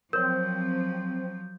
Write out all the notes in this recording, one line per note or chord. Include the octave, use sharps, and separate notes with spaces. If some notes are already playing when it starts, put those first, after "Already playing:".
F3 F#3 C4 A#4 C#5 G6